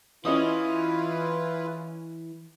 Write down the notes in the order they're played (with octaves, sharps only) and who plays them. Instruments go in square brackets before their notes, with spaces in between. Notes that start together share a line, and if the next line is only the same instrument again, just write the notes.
[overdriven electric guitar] E3 [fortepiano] C#4 D#5 D#6 [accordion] E4 F4 B4